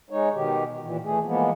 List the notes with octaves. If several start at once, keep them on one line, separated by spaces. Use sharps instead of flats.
G#3 D#4 C#5
B2 D#3 G4
A#2 E3
E3 A3 G#4
E3 F3 G#3 A#3 B3